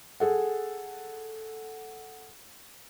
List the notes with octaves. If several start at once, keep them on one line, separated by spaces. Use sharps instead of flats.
G#4 A4 F#5